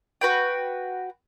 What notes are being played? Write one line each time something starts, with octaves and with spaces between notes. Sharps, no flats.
F#4 B4 G5